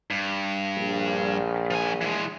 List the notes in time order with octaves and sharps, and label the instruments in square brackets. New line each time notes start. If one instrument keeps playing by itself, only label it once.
[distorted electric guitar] G2
[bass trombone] A#1
[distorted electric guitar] F3 G#5
E3 G#3